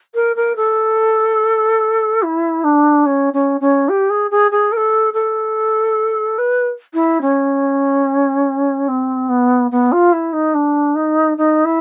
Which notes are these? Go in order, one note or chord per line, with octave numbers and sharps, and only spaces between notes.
A#4
A#4
A4
E4
D4
C#4
C#4
C#4
G4
G#4
G#4
G#4
A#4
A4
A4
B4
E4
C#4
C4
B3
B3
F4
E4
D#4
D4
D#4
D#4
E4